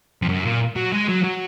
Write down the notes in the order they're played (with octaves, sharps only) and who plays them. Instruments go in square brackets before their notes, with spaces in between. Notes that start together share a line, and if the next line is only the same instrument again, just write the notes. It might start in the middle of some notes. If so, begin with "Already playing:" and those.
[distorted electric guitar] F2
F#2
A#2
F#3
G#3
F#3
F#3